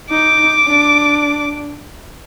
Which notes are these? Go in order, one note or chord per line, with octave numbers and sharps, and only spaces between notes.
D#4 D6
D4